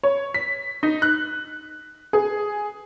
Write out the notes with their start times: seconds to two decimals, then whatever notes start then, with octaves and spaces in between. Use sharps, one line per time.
0.03 C#5
0.34 B6
0.83 D#4
1.02 F#6
2.13 G#4